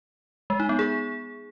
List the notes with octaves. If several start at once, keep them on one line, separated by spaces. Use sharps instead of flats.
G#3
D#4
B3
G#4